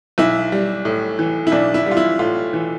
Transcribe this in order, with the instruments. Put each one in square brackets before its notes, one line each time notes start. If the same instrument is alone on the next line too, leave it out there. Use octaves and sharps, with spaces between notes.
[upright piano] B1 E4
G3
A2
E3
E4
B1 D4
E4
G3 F4
E4
A2 F4
E3